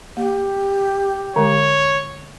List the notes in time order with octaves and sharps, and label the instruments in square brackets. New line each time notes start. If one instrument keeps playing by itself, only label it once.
[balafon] A#3 [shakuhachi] G4
[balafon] D3 G#3 [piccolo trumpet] C#5